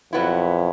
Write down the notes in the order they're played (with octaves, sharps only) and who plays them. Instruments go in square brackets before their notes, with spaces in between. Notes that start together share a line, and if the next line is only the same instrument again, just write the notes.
[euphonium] F2 [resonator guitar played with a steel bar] B2 F#3 B3 E4